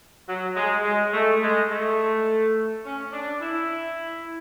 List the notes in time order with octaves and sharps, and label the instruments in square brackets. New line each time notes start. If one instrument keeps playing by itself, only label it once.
[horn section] F#3
G#3
G#3
A3
G#3
A3
C#4
D4
E4